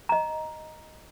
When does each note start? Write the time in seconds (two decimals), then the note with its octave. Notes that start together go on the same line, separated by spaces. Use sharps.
0.09 D#5 A#5